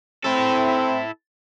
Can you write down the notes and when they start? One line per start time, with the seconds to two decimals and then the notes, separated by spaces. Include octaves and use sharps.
0.25 C4 E4 A4